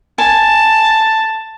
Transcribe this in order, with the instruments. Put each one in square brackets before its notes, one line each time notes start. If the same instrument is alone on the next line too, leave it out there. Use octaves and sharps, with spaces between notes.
[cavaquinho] G#5 [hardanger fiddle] A5